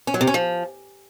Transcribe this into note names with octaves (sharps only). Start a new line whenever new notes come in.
C#4
F#3
C3
C#4
F3